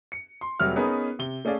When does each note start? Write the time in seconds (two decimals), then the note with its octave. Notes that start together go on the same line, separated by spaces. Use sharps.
0.12 C#7
0.41 C6
0.60 F1 F#3 G3 F#4 E5 F6
0.76 B3 C#4 D#4 G#4 A#4 B4
1.19 C3 G7
1.45 A3 C#4 G#4 D5 F5